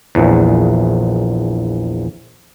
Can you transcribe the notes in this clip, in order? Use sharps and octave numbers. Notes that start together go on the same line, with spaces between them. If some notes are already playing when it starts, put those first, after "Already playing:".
A#1 E2